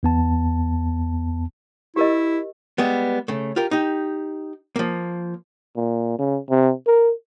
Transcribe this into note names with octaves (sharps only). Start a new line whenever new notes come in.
E2 B3 A5
E4 G4 A#4 D#5
G3 G#3 B3
C#3 A3
F4 G4 A#4
D#4 G4
F3 A#3
A#2
C#3
C3
A#4